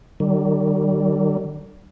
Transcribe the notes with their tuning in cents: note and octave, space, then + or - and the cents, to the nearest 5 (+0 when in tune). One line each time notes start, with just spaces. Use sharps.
D#3 -45 G3 -35